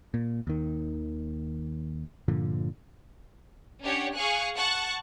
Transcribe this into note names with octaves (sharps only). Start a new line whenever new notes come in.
A#2
D#2 D#3
G2 A#2 D3 F3
C#4 D4 G4 C#5 F#5
G#4 F5 G#5 C#6 F#6
F#5 A5 C#6 F#6